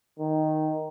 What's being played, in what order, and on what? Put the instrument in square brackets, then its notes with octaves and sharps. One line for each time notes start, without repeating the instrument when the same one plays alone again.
[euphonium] D#3